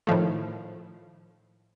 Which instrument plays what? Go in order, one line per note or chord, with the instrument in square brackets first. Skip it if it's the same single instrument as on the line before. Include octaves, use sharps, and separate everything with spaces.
[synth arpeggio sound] A2 D#3 F3 A3